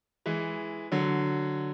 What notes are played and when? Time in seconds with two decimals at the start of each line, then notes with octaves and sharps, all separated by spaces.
0.26 E3 G#3
0.92 D3 F#3